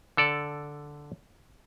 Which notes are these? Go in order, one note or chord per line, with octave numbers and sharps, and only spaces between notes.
D3 A4 D5